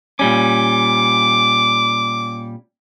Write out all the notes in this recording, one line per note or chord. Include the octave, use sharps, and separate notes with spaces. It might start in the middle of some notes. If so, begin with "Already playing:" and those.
A#2 G3 C#4 D6